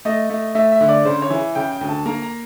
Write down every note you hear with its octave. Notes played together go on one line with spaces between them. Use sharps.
A3 D#5
A3
A3 E5
E5
D3
D5
C#3 C5
C#5
E3
C#3 G5
G5
D2
A5
A#3 A#5
A#5